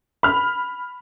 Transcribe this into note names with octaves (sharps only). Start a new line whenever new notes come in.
B5 F6